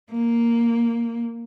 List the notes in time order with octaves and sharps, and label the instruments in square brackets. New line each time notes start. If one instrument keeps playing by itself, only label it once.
[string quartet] A#3